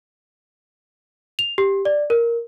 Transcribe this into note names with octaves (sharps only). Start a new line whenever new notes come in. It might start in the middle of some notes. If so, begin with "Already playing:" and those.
F7
G4
D5
A#4